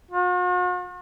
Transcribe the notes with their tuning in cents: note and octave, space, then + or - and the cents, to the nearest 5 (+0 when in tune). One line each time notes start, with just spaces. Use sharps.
F#4 -45